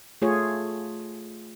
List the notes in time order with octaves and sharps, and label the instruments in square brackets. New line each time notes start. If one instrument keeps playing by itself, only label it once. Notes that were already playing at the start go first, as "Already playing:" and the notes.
[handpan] A3 F4 G#4 C#5